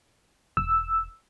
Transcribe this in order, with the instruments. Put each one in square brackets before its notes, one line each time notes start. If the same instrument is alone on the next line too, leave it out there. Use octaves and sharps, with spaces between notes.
[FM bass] E1 [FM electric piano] E6